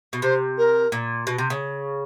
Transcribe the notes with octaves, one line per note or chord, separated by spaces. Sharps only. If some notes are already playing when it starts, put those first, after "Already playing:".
B2
C3 C5
A#4
A#2
B2
C3
C#3